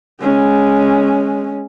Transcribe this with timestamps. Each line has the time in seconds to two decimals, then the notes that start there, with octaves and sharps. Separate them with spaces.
0.21 G#3 C#4